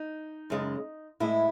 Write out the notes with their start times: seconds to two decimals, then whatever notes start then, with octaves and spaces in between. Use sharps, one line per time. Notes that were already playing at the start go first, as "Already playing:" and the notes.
Already playing: D#4
0.50 F#2 C#3 G#3
1.20 A2 G#3 E4